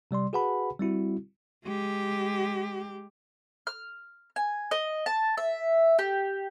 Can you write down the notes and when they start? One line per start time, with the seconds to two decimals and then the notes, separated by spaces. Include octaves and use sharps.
0.11 C3 G3 D5 C6
0.33 F#4 G#4 B4 F#5 A5 B5
0.79 G3 C4 E4 F#4
1.65 G#3 G4
3.67 F6
4.36 G#5
4.71 D#5
5.06 A5
5.37 E5
5.99 G4